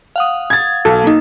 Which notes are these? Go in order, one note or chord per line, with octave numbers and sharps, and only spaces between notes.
F5 F#5 D#6
G#6 A6
B1 A4
A#3 D#4